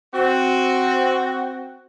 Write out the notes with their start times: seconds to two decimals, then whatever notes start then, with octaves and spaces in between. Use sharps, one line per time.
0.14 C4 F#4